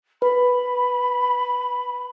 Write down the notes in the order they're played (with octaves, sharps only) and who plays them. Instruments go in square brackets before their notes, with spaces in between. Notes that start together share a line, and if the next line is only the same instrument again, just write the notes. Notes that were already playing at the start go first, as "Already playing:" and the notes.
[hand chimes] B4 [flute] B5